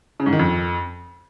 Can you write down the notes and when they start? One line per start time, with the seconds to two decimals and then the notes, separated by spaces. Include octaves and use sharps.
0.20 C#3
0.26 G#2
0.33 D#3
0.39 F2